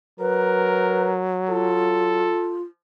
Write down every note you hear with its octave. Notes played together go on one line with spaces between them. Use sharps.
F#3 A#4 B4
F4 A4